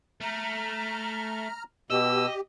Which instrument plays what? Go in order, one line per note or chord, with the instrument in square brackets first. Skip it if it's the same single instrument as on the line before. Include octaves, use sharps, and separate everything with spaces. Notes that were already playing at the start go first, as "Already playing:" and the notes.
[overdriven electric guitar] A3 [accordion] A#5 F6
[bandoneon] B2 E6 [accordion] G4 [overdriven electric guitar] D#5